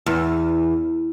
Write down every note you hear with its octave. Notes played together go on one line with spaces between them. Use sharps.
E2